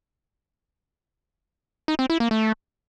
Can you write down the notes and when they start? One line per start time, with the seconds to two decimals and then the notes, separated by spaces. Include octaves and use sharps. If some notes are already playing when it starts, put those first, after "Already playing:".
1.88 D#4
1.99 C4
2.10 E4
2.20 A#3
2.31 A3